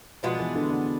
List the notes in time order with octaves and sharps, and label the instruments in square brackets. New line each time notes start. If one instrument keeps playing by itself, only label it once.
[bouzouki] B2 G#3 B3 D4 [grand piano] F3
[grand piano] E3
D3
D3